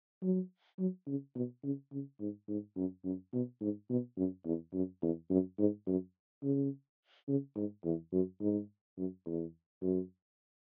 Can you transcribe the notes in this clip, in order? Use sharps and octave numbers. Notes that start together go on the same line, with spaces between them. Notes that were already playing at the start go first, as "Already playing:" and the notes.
F#3
F#3
C#3
B2
C#3
C#3
G#2
G#2
F#2
F#2
B2
G#2
B2
F#2
E2
F#2
E2
F#2
G#2
F#2
C#3
C#3
G#2
E2
F#2
G#2
F#2
E2
F#2